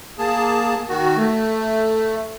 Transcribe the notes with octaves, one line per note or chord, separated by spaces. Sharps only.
A#3 G#4 A5
D#3 F#4
A3